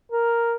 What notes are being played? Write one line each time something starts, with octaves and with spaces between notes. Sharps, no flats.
A#4